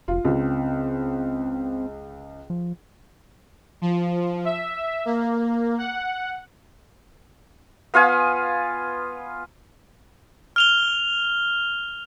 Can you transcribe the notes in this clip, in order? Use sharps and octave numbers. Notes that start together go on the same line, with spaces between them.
F1 F4
C#2 C4
F3
F3
E5
A#3
F#5
B3 F4 F5 G#5
F6 F7 G7